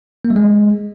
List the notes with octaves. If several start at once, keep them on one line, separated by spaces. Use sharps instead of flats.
A#3
G3
G#3